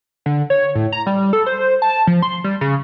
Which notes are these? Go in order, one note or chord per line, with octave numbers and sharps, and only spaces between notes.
D3
C#5
A2
A#5
G3
A4
C5
A5
F3
C6
G3
C#3